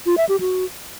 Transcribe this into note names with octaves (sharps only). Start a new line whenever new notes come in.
F4
E5
G4
F#4